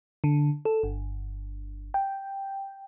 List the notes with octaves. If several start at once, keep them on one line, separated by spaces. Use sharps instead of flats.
D3
A4
G1
G5